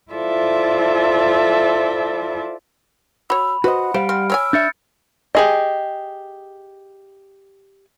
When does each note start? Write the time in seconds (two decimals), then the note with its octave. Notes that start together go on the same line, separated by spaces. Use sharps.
0.12 E4 F4 A4 C5 D5 E5
3.30 F#4 C#5 B5 E6
3.64 F#4 B4 C5 D#5 F#5
3.94 G3 C5 F5 D7
4.09 C4 F6
4.30 C4 C#5 G#5 E6
4.53 D4 E5 G6 A6 C#7
5.35 G4 G#4 D#5